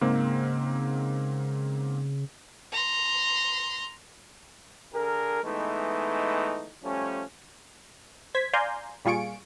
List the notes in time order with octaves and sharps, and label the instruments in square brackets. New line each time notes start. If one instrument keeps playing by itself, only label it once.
[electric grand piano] G#2 A#3 C4 [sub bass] C#3
[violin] A#5 C6
[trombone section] D3 G#4 A#4
E3 G#3 A3 B3 D#4
F3 G3 A3 C#4
[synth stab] C5 G#6 B6
D5 F5 G#5 A#5 C6 G6
A#2 G3 F4 G#4 C#6 D7